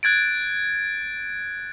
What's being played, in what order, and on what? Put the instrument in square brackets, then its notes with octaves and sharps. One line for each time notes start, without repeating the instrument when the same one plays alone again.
[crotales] F#6 G#6 A6 D7